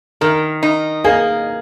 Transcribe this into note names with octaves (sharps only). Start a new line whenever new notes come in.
D#3 A#4
D#4
A#3 G#4